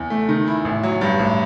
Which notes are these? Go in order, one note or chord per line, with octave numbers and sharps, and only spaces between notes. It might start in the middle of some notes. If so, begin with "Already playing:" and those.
Already playing: E2
A3
D#3
E4
A1
F#3
G2
A1